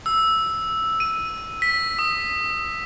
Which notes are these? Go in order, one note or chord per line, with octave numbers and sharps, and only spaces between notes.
E6
D#7
B6
D#6